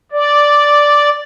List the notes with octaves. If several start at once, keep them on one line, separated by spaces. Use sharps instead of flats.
D5